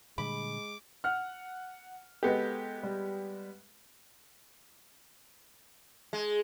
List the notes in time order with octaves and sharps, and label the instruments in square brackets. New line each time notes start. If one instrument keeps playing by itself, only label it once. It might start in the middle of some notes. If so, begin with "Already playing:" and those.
[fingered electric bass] A#2 D3 G3 [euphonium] G#3 [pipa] B5 [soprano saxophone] D6
[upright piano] F#5 F6
[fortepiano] G#3 B3 G4 [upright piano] A4
[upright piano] G3
[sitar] G#3